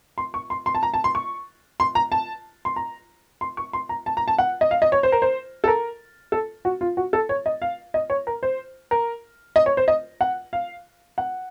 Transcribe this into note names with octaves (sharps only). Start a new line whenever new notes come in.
C6
C#6
C6
C6
A5
A#5
A5
C6
C#6
C6
A#5
A5
C6
A#5
C6
C#6
C6
A#5
A5
A#5
A5
F#5
D#5
F5
D#5
C#5
C5
A#4
C5
A4
A#4
A4
F#4
F4
F#4
A4
C#5
D#5
F5
D#5
C#5
A#4
C5
A#4
D#5
C#5
C5
D#5
F#5
F5
F#5